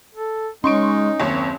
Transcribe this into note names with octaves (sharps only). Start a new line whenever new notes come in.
A4
G#3 C#4 D#4 C6 C#6 D7
F#1 D#2 C4 C#5